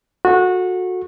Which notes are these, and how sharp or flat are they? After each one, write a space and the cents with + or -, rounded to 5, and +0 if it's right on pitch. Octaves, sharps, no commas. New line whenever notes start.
F#4 -20 A4 +0